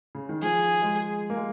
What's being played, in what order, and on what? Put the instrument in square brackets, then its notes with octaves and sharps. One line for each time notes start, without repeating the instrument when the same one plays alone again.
[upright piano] C#3
D#3
[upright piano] F3 [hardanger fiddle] G#4
[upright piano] G#3
A#3
G#3